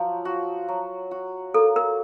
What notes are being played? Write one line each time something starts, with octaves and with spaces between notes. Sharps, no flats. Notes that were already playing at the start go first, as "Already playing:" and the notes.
Already playing: F3 F#3
F#4
F#3
F#4
A#3 A4
A#4